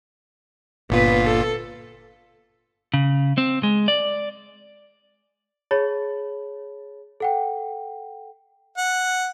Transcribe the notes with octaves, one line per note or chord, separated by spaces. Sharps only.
G1 A#2 B3 F4 B4
A4
C#3
C4
G#3
D5
G#4 C#5 A5 B5 A6
A4 F#5 G5
F#5